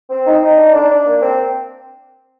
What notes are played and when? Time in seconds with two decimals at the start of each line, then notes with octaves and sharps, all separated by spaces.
0.10 C4
0.26 D#4
0.42 D#4
0.57 D4
0.73 D4
0.89 D4
1.06 A#3
1.22 C4